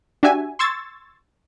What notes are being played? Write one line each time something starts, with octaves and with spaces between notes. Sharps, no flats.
D4 F#4 G4 E5 G#5
C6 C#6 E6 G#6 A6